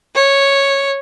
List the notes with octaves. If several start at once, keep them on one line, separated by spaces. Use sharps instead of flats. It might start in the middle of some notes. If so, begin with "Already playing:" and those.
C#5